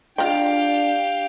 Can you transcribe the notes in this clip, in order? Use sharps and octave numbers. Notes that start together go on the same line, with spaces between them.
D4 F4 G4 D#5 F5 G5